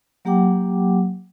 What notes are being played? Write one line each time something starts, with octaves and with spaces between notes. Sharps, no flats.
F#3 A#3 G4 F#5 G5 D6